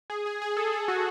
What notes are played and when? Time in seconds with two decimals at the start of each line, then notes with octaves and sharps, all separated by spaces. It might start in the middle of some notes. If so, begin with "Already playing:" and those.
0.10 G#4
0.26 G#4
0.42 G#4
0.57 A4
0.73 G#4
0.88 F#4